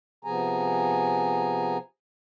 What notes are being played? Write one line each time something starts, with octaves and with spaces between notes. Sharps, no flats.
C3 F3 B3 G#4 G#5 A#5